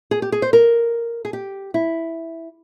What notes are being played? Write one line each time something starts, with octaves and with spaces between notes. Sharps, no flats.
G#4
G4
G#4
C5
A#4
G#4
G4
E4